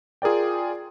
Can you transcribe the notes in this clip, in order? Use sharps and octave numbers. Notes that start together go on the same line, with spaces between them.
F4 G#4 A#4 D5 G5